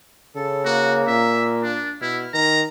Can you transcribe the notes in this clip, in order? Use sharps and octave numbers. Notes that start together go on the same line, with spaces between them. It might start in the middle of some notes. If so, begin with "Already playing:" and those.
C#3 A4
A#3 F#4
A#2 E5
D4
B2 E4 F6
D#3 A#5